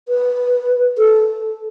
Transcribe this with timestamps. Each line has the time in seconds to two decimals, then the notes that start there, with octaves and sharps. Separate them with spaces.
0.08 B4
0.98 A4